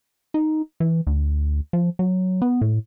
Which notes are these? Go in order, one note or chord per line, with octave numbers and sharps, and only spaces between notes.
D#4
E3
D2
F3
F#3
B3
A2